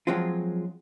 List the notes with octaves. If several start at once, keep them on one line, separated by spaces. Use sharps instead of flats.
F3 F#3 G#3 C4 F4